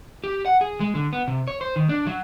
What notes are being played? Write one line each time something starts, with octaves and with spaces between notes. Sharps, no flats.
G4
F#5
G#4
G#3
D3
B3
C3
C#5
C5
D#3
D4
F#3